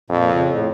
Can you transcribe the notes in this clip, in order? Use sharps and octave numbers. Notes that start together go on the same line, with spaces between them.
F2 A#2
C#3
A2